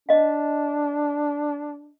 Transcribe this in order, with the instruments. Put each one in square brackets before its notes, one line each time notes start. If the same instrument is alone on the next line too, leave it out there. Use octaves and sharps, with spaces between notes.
[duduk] D4 [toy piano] D#5 F5